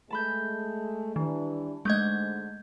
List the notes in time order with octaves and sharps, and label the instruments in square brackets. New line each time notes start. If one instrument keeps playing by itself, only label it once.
[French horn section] G#3 A3 [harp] A5 B5 G6
[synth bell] D#3 [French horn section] E3 G3 D4
[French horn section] G#2 D3 [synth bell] G#3 A3 D#5 [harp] G6 G#6